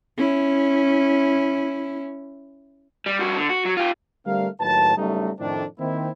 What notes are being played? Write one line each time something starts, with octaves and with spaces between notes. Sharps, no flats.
C#4 E4
G3
G2 F#4
D3
F#4
F#3
F4 G4
D3 G3 A3 C4 A#4 F5
D#2 A2 F#3 B4 A5
F#1 G3 A3 C#4 D#4
F2 A2 D#3 A3 C4 D4
D#3 A#3 C4 E4